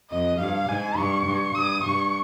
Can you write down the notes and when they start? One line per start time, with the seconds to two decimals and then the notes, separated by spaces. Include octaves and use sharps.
0.10 F2 D#5
0.40 G2 F5
0.69 G#2 G#5
0.97 G2 C#6
1.26 G2
1.55 G2 D#6
1.83 G2 C#6